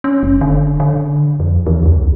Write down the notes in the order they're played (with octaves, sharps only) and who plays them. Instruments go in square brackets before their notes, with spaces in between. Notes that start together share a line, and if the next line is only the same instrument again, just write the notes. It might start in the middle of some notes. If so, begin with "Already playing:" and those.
[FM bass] C#4
F#1
D3
D3
F2
E2
C#2